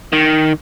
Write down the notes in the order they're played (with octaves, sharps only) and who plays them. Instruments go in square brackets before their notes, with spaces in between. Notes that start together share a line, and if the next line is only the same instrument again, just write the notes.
[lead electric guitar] D#3